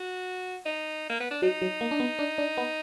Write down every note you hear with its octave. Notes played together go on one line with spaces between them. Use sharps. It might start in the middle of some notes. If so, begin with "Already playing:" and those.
Already playing: F#4
D#4
A#3
B3
D4
F#3 D#4
F#3
A#3
D4
B3
D4
D4
B3